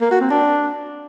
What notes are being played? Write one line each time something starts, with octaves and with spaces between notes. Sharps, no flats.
A#3
F#4
C4
D4